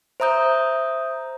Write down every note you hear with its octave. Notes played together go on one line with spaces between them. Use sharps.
C5 E5 A#5 D#6 G6